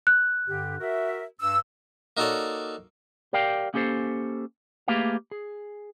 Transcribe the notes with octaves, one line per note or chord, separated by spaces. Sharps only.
F#6
G2 D3 G4
F#4 A#4 E5
G2 E6
A#3 D#4 F#4 A4 C#5 D5
G4 A#4 D5 F5 G5
A#3 C#4 G4 A4 C5
A3 A#3 G4 G#4 B4 F5
G#4